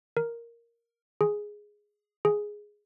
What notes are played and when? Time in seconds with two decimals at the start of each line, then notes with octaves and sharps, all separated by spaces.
0.17 A#4
1.21 G#4
2.25 G#4